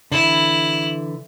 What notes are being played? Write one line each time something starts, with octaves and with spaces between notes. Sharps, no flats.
D3 E3 E4